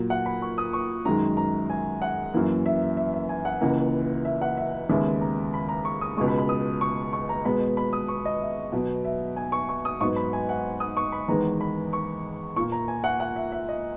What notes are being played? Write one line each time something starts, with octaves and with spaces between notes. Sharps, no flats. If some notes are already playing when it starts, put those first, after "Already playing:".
Already playing: A#2 F#3 A#3
F#5
B5
C#6
D#6
C#6
F#2 D#3 G#3 A#5
A#5
G#5
F#5
F#2 E3 A#3
E5
E5
E5
G#5
F#5
C#2 C#3 E3 A#3
E5
F#5
E5
D#2 C#3 G#3 B3 E5
A#5
B5
A#5
C#6
D#6
C#2 B2 G#3 C#6
B5
B5
D#6
C#6
C#6
A#5
B2 G#3 B3 B5
B5
D#6
C#6
D#5
E5
B2 F#3 B3
E5
G#5
C#6
C#6
D#6
G#2 F#3 B3 C#6
B5
G#5
F#5
D#6
C#6
B5
E2 D#3 G#3 B3 A#5
B5
C#6
A#2 A#3 C#6
A#5
G#5
F#5
F#5
E5
E5
D#5